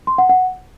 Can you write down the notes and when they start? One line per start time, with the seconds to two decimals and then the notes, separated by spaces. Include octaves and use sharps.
0.07 C6
0.18 F#5
0.29 F#5